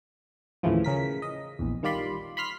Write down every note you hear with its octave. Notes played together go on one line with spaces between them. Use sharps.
D#2 A2 C#3 E3 F3
C#3 A#4 B6
D#5
A#1 E2
D#3 G3 F4 D5 B5 C6
B5 C6 F6 B6